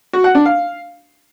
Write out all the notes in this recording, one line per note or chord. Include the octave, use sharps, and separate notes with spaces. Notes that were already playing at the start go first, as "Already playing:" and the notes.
F#4
F#5
D4
F5